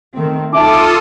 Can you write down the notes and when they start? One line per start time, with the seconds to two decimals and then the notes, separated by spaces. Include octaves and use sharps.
0.14 D#3 A3 C4
0.53 C2 D#4 F4 A4 E5 A5 D6 D#6